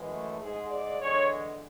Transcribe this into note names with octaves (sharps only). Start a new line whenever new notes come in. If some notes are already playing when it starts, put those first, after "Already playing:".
Already playing: F#2 E3 G#3
A3
G#2 G#3 G#4
D5
E2 D3 G#3 C#5